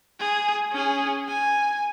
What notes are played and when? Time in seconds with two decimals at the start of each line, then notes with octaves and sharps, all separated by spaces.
0.19 G#4
0.72 C#4 G#4
1.28 G#5